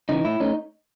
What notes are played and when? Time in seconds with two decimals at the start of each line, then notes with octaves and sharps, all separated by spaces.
0.09 C#3 E3 D#4
0.25 A2 E4
0.40 A3 C#4 D#4